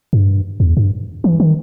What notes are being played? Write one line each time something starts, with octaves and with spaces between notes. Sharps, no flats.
G2
E2
G2
E3
D#3